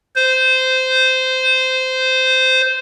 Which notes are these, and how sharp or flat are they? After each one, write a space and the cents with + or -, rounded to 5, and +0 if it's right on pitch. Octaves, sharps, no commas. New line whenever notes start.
C5 -15